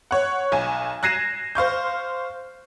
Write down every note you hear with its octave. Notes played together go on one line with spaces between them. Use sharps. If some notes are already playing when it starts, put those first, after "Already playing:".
C#5 F#5
B1 G#5
F#6 G#6 A#6 C7 D#7 E7
C5 F5 C#6 G6